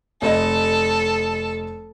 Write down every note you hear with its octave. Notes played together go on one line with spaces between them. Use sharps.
F1 A4 D#5